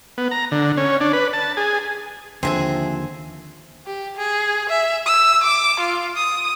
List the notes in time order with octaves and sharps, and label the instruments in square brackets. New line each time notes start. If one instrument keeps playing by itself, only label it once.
[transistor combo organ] B3
A#5
D3
C#4
D4
B4
A5
G#4
[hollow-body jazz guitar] D#2 D3 [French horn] F3 [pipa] C4 [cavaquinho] G#4 E5 G#5
[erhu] G4
G#4
E5
E6
D6
F4
D#6